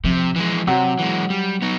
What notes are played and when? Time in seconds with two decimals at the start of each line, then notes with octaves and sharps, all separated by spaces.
0.04 C3 F3
0.36 E3 G#3
0.67 C3 F#3
0.99 E3 G#3
1.30 G3
1.62 B3 D#4